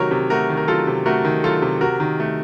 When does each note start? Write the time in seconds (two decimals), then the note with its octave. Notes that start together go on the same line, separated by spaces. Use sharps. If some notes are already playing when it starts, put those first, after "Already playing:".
Already playing: C3 D#3 F#3 A3 F#4 A#4 C#5
0.11 C3
0.30 A3 F#4 A#4
0.49 D#3
0.57 A#4
0.68 F#3 F4 A4
0.87 C3
1.06 A3 F#4 A#4
1.25 D#3
1.44 F#3 F4 A4
1.62 C3
1.81 C3 F#4 A#4
2.00 D#3
2.20 A3